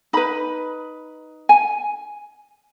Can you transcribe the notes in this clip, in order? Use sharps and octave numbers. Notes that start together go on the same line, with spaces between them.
D#4 B4 B5
G#5